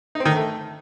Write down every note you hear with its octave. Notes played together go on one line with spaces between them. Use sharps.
D#4
C4
D#3
D3
A3